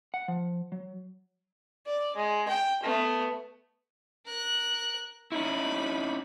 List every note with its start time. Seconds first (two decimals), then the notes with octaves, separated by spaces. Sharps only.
0.14 F#5
0.28 F3
0.72 F#3
1.86 D5
2.16 G#3
2.48 G5
2.82 A3 B3
4.26 A#4 F#6
5.32 C#4 D#4 E4 B5